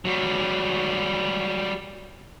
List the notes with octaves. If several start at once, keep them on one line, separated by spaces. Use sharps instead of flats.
F#3 G3